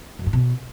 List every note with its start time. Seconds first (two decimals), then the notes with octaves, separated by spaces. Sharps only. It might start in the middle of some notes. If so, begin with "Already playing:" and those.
0.19 F#2
0.26 G2
0.33 B2